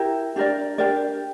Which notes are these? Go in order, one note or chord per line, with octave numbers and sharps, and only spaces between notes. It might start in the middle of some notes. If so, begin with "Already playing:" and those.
Already playing: E4 G4 A#4
D4 G4 A#4 D5
D4 G4 A#4 D5